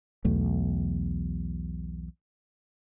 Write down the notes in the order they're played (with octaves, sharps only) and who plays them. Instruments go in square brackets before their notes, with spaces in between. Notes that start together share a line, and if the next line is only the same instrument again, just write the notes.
[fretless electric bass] B1 E2 A3